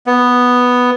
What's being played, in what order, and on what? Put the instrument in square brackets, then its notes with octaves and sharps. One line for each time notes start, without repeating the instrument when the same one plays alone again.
[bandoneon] B3